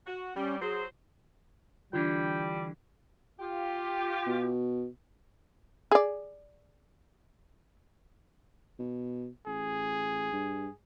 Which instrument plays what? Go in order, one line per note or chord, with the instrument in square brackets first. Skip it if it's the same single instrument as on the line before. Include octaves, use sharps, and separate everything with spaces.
[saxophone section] F#4
[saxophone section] G3 [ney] C#4
[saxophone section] F#3 C5 [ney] G#4
[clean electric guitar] D3 E3 [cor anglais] G3 [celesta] D4 F4 [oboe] G5
[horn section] F4 G4
[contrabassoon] B2
[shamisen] G#4 D5
[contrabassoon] B2
[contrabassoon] A1 [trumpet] G#4
[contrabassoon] G2